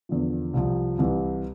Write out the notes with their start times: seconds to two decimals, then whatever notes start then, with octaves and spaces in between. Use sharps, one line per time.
0.09 E2 D3 F3
0.54 C2 C3 F3
0.98 C2 C3 E3